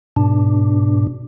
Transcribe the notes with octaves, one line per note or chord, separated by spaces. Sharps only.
G#2 B2 D4